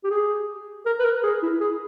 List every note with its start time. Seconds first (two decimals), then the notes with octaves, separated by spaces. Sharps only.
0.04 G4
0.11 G#4
0.86 A#4
1.00 B4
1.05 A#4
1.23 G#4
1.43 E4
1.60 G#4